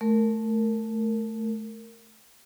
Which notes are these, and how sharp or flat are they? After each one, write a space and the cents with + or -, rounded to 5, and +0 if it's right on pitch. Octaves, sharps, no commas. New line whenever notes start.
A3 -10 A#4 -15